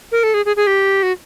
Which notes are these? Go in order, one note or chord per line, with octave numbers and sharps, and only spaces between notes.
A#4
A4
G#4
G#4
G#4
G4
F#4